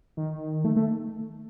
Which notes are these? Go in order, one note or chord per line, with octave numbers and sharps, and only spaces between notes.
D#3
A3
A3